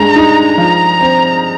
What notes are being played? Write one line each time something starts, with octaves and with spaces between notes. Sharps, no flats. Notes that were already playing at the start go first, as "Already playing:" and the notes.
Already playing: G2 G#3 A#5
D#4
F3
C4